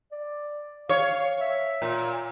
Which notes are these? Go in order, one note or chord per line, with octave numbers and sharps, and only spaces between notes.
D5
C#5 F5
E5
A#2